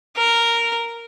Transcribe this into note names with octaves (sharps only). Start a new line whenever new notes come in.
A#4